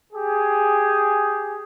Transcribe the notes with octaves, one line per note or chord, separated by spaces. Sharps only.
G4 G#4